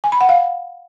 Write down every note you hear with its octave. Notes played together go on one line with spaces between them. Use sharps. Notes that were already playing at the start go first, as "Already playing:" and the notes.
G#5
B5
F#5
F5